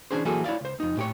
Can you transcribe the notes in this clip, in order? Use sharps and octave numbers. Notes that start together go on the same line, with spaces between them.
E3 G#3 C#4 D4 G#4 C5
E3 F#3 A#3 F#4 G#4 A4
E4 C#5 D5 F5
C#2 C5
F2 D#4
A2 G4 C#5